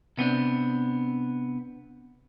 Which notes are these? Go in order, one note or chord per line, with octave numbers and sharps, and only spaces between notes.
C3 B3 C4 D4